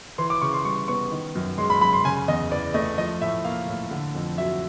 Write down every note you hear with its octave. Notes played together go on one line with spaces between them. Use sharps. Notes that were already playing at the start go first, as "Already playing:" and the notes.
E3 C6
D6
C#3 C#6
C6
G3 C#6
B3 C#6
D#3
F#2
G#3 C6
B5
F#2 B5
C6
C#3 G#5
E2 D#5
E3 D5
A3 D#5
F3 D#5
A2 E5
A#3 F5
A2
D3
F2
F#3 E5